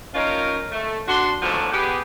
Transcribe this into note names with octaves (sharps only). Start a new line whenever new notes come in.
F3 C#4 D#4 F4 A#4
A3
D4 F#4 C6
G#2 B2 D3 F3 F#3 A3
B3 G4 G#4